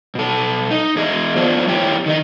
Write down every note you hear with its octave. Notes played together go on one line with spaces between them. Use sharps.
B2 A4
D#4
E2 G#4 D#5
F2 F3 B3 D4 F4 C5
F2 E4 G4 C#5 G5
D#3 D#4 D#5